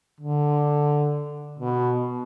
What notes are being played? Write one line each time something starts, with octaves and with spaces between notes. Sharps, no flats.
D3
B2